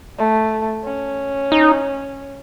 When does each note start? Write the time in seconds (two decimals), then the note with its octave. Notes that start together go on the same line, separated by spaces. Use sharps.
0.19 A3
0.85 C#4
1.52 D#4